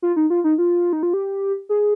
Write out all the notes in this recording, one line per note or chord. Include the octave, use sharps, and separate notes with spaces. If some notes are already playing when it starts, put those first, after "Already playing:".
F4
D#4
F4
D#4
F4
D#4
F4
G4
G#4